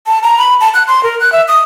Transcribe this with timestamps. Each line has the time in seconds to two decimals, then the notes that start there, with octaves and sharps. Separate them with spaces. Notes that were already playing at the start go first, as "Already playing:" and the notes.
0.07 A5
0.23 A#5
0.38 B5
0.61 A5
0.74 F#6
0.87 C6
1.03 A#4
1.20 F#6
1.33 E5
1.48 D#6